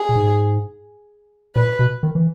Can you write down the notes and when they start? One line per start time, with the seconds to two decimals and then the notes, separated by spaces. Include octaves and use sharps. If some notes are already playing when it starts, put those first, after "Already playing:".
Already playing: G#4
0.09 A#2
0.16 G#2
1.56 A#2 B4
1.79 B2
2.03 D#3
2.15 E3